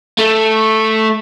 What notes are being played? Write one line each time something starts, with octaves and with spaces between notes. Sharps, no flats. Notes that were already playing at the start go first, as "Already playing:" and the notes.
A3